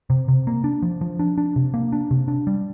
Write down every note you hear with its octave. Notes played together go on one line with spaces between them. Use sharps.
C3
C3
A#3
D4
F3
F3
D4
D4
C3
A#3
D4
C3
D4
G3